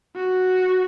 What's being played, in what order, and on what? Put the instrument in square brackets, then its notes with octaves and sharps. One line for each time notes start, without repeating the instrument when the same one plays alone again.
[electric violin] F#4